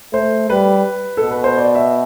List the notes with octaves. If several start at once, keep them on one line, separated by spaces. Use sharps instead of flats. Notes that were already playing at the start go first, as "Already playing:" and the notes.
A3 C5
G3 B4
B2 A4
B4
C5
D5
E5